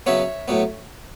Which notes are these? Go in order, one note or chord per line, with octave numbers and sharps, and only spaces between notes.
C#3 F#3 B3 C#5 E5
A2 F#3 B3